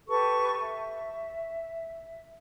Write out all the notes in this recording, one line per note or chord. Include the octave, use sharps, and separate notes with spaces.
G4 A4 B4 C#6
E5